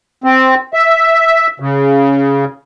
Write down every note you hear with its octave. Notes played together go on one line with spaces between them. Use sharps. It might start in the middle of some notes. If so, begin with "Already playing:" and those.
C4
E5
C#3